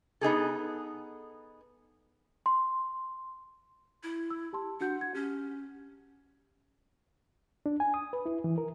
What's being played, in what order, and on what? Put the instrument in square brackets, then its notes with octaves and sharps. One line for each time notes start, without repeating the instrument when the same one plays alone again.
[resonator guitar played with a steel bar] B3 D#4 G#4 A4
[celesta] C6
[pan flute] E4
[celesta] E6
G4 A5 C6
[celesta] D4 F#4 G6 [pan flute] F#5
[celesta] G#6
[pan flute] C#4 [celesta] G4
[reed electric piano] D4
G#5
D#6
B4
E4
E3
A#4